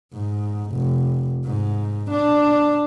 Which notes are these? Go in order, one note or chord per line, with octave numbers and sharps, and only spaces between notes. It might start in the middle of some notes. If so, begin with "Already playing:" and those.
G#2
F1
G#2
D4